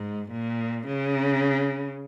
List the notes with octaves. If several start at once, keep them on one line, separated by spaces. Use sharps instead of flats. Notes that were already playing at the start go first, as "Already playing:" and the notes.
Already playing: G#2
A#2
C#3